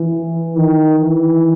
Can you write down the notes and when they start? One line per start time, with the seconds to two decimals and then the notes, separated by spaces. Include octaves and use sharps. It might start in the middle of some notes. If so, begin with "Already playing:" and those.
Already playing: E3
0.56 D#3
1.00 E3